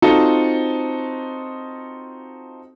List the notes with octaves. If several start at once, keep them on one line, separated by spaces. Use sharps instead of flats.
C4 D#4 F4 F#4 A4 C5